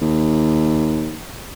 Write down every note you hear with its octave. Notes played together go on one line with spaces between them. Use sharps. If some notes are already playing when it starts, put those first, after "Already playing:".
D#2